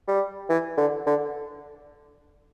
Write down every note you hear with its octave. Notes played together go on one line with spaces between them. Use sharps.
G3
E3
D3
D3